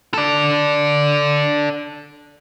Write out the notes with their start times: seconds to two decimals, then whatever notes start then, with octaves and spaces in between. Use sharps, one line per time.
0.14 A4 D5